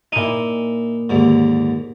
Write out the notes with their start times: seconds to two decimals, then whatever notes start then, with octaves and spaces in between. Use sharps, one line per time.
0.12 A#2 D#4 E4 D#7
1.09 D#2 G#2 D3